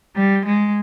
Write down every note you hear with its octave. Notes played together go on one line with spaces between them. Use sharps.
G3
G#3